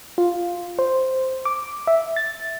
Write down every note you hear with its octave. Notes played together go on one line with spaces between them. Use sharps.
F4
C5
D6
E5
A6